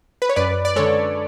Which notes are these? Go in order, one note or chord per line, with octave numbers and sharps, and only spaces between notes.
B4
C#5
F#2 B4 D5
D5
D3 G#3 A4 C#5